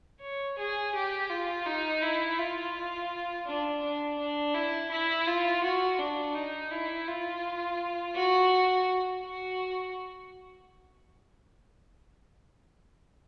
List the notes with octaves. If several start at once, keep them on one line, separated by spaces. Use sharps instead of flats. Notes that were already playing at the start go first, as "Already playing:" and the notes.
C#5
G#4
G4
F4
D#4
E4
F4
D4
D4
D4
E4
E4
F4
F#4
D4
D#4
E4
F4
F#4
F#4